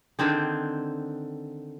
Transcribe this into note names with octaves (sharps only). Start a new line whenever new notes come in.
D3 D#3 C4 G#4